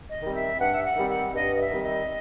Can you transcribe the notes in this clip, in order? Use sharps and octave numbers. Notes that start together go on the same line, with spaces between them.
D#5
D#3 G3 C4
E5
G2 F#5
E5
F#5
D#3 G3 C4
F#5
G2 D#5
D#5
E5
D#3 G3 C4
D#5